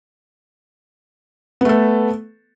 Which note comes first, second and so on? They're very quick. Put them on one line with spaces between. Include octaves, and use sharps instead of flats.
B3 A3 A4